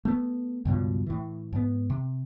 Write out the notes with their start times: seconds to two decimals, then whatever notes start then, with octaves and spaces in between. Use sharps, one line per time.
0.05 A3 B3
0.65 C#2 G2 B2 F3
1.06 A2 E3
1.53 G#2 B3
1.90 C3